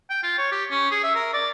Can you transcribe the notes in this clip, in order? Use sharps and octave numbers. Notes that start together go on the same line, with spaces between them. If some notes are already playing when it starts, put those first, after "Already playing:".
G5
F4
C#5
G4
C#4
G#4
E5
A#4
D5